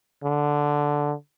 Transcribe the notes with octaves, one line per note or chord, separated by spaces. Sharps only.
D3